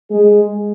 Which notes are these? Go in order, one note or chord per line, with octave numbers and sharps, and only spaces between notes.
G#3 G#4